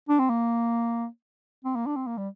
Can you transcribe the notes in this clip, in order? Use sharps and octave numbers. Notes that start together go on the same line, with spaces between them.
D4
C4
A#3
C4
A#3
D4
C4
A#3
G3